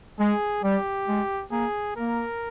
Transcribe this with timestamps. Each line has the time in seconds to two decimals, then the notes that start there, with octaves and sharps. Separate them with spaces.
0.19 G#3 G#4
0.63 G3 G4
1.08 G#3
1.51 A#3 G#4
1.97 A#3 A#4